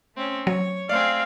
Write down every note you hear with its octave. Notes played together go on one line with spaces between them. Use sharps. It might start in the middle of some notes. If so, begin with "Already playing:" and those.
A3 C4 C#4
F#3 C#5
A3 C4 G#4 D5 F5